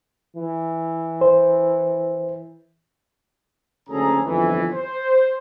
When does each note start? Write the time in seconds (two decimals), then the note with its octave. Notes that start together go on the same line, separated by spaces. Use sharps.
0.37 E3
1.21 C5
3.89 F#1 D2 C#4 G#4 A4 A#5
4.25 G1 F2 B2 E3
4.73 C5